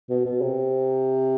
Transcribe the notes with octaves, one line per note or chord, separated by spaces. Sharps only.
B2
B2
C3